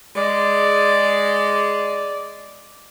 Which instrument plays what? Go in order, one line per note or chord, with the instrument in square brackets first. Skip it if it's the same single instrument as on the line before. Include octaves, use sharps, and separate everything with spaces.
[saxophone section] G#3 [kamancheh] D5